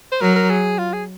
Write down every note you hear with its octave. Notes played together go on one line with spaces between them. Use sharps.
C5
F#3 A#4
A#4
G#4
F4
G#4